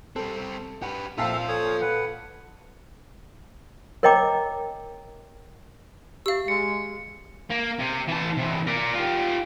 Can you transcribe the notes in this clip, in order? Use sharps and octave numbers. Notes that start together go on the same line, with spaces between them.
G3 C4 A4
G4 B4 F#5
A#2 C4 F4 A4 C5 E5 F5 A5
A4 C#5 D#6
B4 F#5
A#4 C#5 D#5 G5 A#5 D6
G4 E5 F5 E6
G#3 C#7
A#3
C3
E3 A5
C3 E3
A#4 D5
F4 G4